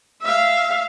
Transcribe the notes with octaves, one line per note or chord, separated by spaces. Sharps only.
E5 F5